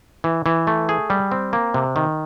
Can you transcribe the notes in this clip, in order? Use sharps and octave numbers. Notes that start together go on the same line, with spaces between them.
E3
E3
A3
G#4
G3
C4
A#3
C3
D#3